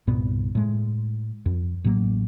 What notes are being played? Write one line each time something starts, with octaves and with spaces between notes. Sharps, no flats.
C2 G2 A#2 B3
A2 G#3
F2
A1 A2 F#3 A#3